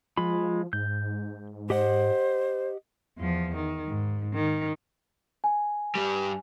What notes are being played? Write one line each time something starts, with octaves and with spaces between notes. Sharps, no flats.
F3 G#3 F4 B5
G#2 G6
G4 C5 D#5 F#5
E2 F3
D#3
G#2
D#3
G#5
G2 G3